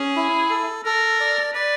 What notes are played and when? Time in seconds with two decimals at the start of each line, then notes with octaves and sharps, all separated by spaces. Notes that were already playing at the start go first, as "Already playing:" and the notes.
Already playing: C#4 G#4
0.16 E4
0.50 A4
0.85 A4 A#4
1.20 D5
1.54 B4 D5